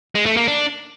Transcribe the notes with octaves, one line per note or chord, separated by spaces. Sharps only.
G#3
A3
A#3
D4